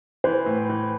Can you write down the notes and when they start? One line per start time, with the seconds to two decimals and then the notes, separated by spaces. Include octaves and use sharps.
0.24 E3 C5
0.46 A2
0.70 E3